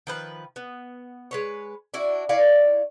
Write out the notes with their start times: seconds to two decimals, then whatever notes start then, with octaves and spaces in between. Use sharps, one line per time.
0.07 D#3 F3 B4
0.56 B3
1.31 G#3 B4 C#5
1.94 D4 E4 F#4
2.29 E4 C#5 D5 F5